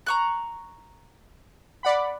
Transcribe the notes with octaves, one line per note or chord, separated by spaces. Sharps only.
A#5 C#6 F#6
D5 F#5 B5